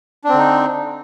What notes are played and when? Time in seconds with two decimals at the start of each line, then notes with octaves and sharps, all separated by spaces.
0.24 D4
0.29 C4
0.33 D3
0.38 D#4